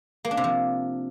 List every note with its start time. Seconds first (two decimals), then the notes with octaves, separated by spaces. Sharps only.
0.25 A#3
0.31 D4
0.37 C3
0.44 F3